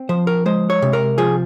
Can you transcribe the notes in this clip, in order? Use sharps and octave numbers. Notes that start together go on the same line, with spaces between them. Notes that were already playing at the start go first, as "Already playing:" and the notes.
Already playing: C4
F3 C5
A#4
G#3 C5
C#5
C3
A#4
F3 G#4